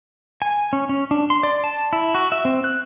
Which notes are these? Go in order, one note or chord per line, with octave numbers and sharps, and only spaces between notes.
G#5
C#4
C#4
D4
C6
D5
A5
E4
F#4
E5
C4
F#6